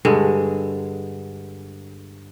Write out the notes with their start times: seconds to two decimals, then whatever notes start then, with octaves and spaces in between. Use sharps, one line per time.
0.05 G2 D3 G#3